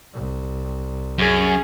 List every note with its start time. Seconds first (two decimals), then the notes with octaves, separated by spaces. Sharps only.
0.14 C2
1.19 F#2 C#4 G#4